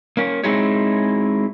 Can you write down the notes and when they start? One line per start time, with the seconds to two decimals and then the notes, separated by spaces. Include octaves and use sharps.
0.17 A#3 C#4
0.44 G#3 C4 D#4 E4 G#4 C#5